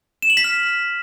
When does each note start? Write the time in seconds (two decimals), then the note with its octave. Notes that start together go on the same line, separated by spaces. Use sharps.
0.22 E7
0.30 F#7
0.37 B6
0.44 F6